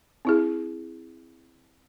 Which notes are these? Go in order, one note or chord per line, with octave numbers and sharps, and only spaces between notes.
C4 E4 G#4